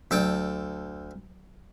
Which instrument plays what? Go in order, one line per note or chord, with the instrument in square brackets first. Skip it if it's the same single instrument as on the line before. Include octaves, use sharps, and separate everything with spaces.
[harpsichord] D2 A4 G5 [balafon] F#3